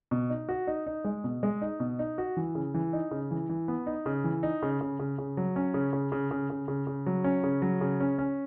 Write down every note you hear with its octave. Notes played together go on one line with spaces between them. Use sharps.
B2
D#4
F#4
D#4
D#4
G#3
B2
G#3
D#4
B2
D#4
F#4
E3
C#3
E3
D#4
C#3
E3
E3
B3
D#4
C#3
E3
D#4
C#3
C#3
C#3
C#3
F#3
C#4
C#3
C#3
C#3
C#3
C#3
C#3
C#3
F#3
C#4
C#3
F#3
C#3
C#4
C#4